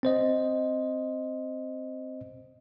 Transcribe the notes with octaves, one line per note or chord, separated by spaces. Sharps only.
C4 C5 D#5